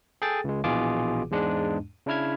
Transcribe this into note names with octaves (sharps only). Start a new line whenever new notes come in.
G#4 A4 G5 A6
C#2 G#3
A#1 B2 E3 F4 G#4 D6
E2 G#2 G#3 D4
C#3 D4 E4 F6 G#6